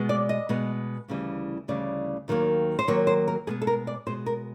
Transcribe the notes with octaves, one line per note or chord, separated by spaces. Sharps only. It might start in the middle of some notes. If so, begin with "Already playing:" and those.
Already playing: B2 G#3 B3
D5
D#5
B2 G#3 B3
D2 C#3 E3 G3
D2 C#3 E3 G3 D5
D#2 D#3 F#3 A#3
C5
D#2 D#3 F#3 A#3 C#5
C5
A#4
B2 G#3 B3 G#4
A4
A#4
D5
B2 G#3 B3 C5
A#4